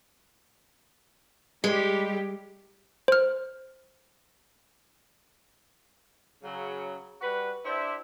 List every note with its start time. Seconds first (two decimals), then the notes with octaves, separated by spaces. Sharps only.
1.64 G3 G#3 G4
3.08 C5 F6
6.43 C#3 F#3
7.21 G3 F#4 B4
7.64 D4 E4 G4 C5 E5